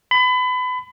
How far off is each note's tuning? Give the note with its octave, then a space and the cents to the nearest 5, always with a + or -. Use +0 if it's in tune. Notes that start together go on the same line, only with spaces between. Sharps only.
B5 +30